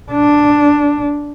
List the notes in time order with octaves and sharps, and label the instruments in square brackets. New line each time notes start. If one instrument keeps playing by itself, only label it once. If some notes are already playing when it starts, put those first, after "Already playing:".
[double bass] D4